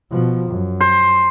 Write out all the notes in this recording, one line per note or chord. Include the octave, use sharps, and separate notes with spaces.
B2 F3
F#2
C5